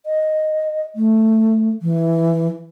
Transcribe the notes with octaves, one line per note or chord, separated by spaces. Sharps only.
D#5
A3
E3